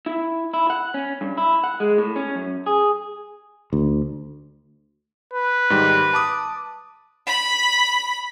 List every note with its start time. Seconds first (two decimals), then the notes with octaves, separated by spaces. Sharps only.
0.06 E4
0.54 E4
0.70 F#5
0.94 C#4
1.21 G2
1.37 E4
1.64 F#5
1.80 G#3
1.98 A2
2.16 C#4
2.36 F#2
2.66 G#4
3.73 D2
5.33 B4
5.70 G#2 D#3 G3
6.14 A5 D6 D#6
7.26 B5